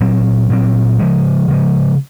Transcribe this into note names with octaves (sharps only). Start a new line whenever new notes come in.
A#2 F#3 C4
A#2 F#3 C4
C#3 F3 G#3
C#3 F3 G#3